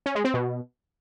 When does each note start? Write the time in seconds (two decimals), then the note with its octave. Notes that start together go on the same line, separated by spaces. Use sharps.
0.06 C#4
0.15 G#3
0.25 C4
0.34 B2